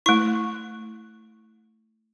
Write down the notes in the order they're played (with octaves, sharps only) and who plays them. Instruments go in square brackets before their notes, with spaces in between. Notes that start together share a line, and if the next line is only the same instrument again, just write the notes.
[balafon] A3 E4 [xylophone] C#6